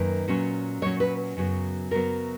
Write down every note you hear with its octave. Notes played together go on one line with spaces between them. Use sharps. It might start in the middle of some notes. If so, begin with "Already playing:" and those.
Already playing: F#2 D#3 A#3 B4
A#2 F#3 C#4
A#2 F#3 C#4 C#5
B4
F#2 C#3 F#3 B3
F#2 C#3 F#3 B3 A#4